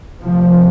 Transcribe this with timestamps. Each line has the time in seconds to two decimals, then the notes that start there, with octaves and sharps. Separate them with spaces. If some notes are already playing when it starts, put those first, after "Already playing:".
0.22 D2 C3 F3